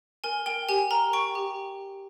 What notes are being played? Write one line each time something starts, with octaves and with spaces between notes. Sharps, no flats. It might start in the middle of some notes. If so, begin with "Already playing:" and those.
A#4 G#5
A#4 G5
G4 G#5
A#4 A#5
G5 C#6
G4